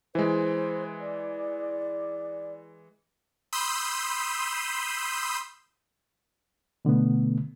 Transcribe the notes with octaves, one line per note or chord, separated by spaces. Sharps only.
E3 G#3 C5
D5
B5 C6 D#6 E6 G6
B2 D3 A3 B3